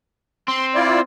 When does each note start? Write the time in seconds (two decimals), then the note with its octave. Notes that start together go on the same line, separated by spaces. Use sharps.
0.48 C4 C6
0.75 E4 F4 D5